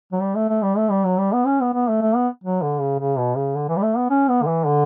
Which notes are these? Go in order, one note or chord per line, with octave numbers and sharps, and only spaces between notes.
F#3
G3
A3
A3
G3
A3
G3
F#3
G3
B3
C#4
B3
B3
A3
A3
B3
F#3
D3
C#3
C#3
B2
C#3
D3
E3
G3
A3
B3
C#4
B3
D3
E3
D3